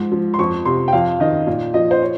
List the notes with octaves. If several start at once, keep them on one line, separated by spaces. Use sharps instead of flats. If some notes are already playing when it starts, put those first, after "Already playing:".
Already playing: G#2 F3
F3
C6
F2 C#6
C3 C6
G5
F2 F5
D#3 D#5
A#2
F3 D#5
C5
C#5